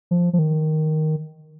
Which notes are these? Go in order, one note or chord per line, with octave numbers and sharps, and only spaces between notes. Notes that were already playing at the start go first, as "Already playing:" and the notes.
F3
F3
D#3